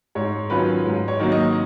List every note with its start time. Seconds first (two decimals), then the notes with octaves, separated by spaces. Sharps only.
0.15 G#2 C#5
0.50 D#3 F#3 C#4 F4 B4
0.86 G#2
1.08 C#5
1.19 D#3 F#3 A#3
1.32 D#5